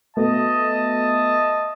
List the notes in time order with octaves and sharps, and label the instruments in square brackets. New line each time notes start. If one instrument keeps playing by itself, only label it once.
[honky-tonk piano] A3 B3 F#4 [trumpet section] D#5 E5 A5